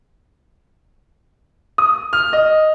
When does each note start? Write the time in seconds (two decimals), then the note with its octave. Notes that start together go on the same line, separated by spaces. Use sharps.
1.78 D#6
2.13 F6
2.33 D#5